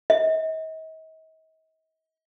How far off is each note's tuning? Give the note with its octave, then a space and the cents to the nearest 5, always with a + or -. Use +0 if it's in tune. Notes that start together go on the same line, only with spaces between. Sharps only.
D#5 +40